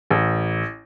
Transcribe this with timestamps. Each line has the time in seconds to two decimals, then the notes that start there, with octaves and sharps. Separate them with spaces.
0.11 A1